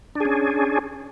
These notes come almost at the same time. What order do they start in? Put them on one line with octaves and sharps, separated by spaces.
D4 G#4 C#4